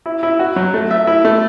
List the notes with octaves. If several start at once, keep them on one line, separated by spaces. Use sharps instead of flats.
E4
E4
F#4
F#3
A3
E5
E4
A3